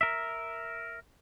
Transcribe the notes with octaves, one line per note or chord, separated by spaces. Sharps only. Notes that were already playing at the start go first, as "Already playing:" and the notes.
A#4 E5